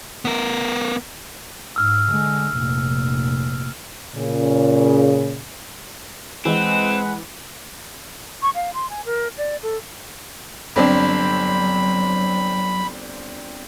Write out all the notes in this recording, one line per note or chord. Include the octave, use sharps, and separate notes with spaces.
B3 A#4
G#2 E6 F6
D3 G#3
F1 A#2
A#2 C#3
E3 G#3 C4 B4 F#5
C#6
F5
C6
G#5
A#4
D5
A4
G1 F#3 C4 D4 B5